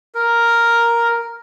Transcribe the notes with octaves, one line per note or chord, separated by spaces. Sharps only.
A#4